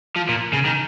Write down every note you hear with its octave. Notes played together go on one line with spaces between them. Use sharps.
F3
A#2
C#3
D#3